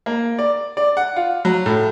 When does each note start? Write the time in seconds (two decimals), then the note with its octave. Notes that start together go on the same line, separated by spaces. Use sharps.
0.06 A#3
0.39 D5
0.77 D5
0.97 F#5
1.16 F4
1.45 F#3
1.66 A2